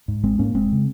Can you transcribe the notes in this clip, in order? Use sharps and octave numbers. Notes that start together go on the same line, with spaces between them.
G#2
G#1 G#3 C4
G#2 A#3 C#4
F1 G#3 C4
C#3